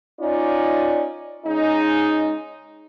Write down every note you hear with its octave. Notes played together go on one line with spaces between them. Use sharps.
C#4 D#4 F4 D5
C#3 G#3 D#4